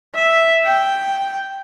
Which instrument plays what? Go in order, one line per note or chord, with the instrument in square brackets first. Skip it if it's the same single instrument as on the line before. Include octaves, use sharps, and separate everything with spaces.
[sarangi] E5
G5